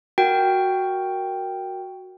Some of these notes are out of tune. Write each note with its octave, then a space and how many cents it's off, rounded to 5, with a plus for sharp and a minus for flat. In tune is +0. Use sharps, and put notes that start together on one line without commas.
F#4 +0 A#4 +0 G5 +0